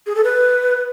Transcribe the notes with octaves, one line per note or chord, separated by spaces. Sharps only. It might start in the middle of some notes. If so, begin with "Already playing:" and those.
G#4
A4
B4